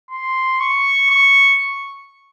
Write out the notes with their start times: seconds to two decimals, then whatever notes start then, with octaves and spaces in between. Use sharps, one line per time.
0.11 C6
0.60 C#6
1.10 C#6